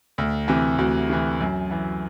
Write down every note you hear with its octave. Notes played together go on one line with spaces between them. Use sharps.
D2
C3 E3
D2 F#4
C3 E3
F#2
E3